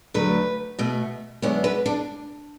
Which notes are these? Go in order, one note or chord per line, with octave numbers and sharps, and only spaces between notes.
D2 D3 F#3 A3 B4
B2 A3
F#2 D3 G#3 B3 C#5
B4
D4